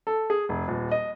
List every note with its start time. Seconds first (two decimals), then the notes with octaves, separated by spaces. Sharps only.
0.07 A4
0.30 G#4
0.49 F1
0.68 D#1
0.91 D#5